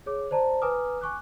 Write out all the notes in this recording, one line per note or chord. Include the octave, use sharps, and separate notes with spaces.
G#4 C#5 D6
C5 D5 A5 A#5
B4 G#5 A#5 D6 D#6 F6
G#5 C#6 D6 F#6